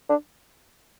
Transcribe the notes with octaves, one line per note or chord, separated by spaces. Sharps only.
D4